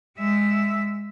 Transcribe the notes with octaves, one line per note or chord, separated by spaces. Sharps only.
G#3 E5